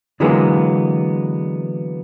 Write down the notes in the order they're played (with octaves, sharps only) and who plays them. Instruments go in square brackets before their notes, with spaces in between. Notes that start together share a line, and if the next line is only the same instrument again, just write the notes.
[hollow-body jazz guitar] D3 E3 F#3 G#3 A#3 B3